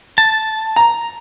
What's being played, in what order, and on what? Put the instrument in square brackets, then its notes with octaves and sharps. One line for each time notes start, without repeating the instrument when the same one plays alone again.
[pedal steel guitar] A5
[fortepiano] A#5